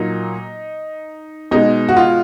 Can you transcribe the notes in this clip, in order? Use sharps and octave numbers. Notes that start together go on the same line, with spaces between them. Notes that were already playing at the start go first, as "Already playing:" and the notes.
Already playing: A#2 F#3 A#3 D#4
B2 G#3 D#4
F#4
F4